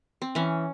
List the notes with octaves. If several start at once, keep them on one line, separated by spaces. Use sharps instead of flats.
C4
E3 C#4